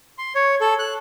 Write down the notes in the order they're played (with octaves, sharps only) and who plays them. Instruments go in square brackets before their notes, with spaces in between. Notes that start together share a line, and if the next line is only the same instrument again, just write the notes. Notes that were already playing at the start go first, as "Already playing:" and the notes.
[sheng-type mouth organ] C6
C#5
A4
F#6